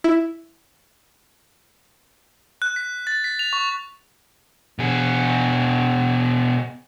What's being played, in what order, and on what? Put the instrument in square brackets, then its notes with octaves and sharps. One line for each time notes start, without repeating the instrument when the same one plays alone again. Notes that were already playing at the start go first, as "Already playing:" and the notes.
[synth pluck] E4
[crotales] F#6
B6
A6
B6
F7
C#6
[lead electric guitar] B2 G#4